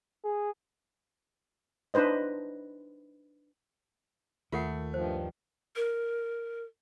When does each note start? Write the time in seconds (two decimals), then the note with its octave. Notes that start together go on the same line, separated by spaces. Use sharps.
0.24 G#4
1.94 D4 D#4 B4 C5 D#5
4.52 D#2 A3 F4 A#4 F#5
4.94 G2 D#3 F3 C5
5.76 A#4